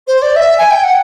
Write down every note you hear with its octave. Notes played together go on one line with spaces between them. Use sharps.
C5
D5
E5
G#5
G5
F#5